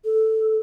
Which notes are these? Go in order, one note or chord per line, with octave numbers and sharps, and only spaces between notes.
A4